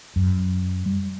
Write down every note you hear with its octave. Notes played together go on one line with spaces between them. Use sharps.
F#2
G3